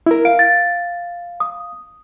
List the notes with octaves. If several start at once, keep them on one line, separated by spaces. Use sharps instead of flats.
E4 A#4
F5 D7
A6
D#6